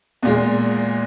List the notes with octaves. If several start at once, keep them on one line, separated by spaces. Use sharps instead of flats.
E2 A#2 G#3